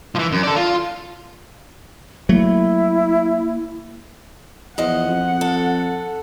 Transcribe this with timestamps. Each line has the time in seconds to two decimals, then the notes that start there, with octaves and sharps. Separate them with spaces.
0.15 E3 F3
0.32 F#2
0.43 A4 D5
0.56 F4
2.29 F#3 A3 A#3 E4
4.78 E2 F3 D#5 F#5
5.08 F2
5.41 A4